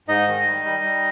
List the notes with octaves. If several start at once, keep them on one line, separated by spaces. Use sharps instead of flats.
G#2 D#4 D#5
D#3
G3
G3
G3